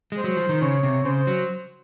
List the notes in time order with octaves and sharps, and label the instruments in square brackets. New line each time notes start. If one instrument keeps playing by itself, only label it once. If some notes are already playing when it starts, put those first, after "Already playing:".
[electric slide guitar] G#3
[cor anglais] C5
[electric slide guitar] F#3
F3
D#3
[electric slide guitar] C#3 [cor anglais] C#5
[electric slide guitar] C3
[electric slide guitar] C#3 [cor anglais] C5
[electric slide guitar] F#3